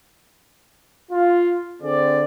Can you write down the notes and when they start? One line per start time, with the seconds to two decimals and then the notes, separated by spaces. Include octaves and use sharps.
1.11 F4
1.82 D3 C4 G#4 D5